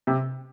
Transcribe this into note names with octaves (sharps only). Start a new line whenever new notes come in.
C3